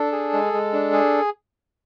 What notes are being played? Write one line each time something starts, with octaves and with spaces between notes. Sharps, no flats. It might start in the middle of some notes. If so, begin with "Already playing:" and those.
Already playing: D4 A4
G#4
G#3
G#3
D4
G#4